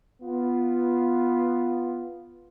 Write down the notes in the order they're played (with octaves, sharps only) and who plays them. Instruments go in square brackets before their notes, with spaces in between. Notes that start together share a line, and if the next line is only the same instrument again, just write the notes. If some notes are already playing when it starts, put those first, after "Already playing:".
[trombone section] B3 F4